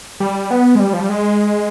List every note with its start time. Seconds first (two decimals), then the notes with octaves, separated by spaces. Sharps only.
0.20 G3
0.51 B3
0.75 G#3
0.80 G3
0.93 F3
1.00 G3
1.09 G#3